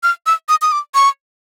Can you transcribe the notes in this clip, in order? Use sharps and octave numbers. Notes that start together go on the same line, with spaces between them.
F6
E6
D#6
D#6
D6
C#6